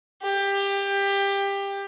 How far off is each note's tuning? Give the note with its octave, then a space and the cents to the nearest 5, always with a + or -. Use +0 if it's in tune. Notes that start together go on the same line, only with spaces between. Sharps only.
G4 +20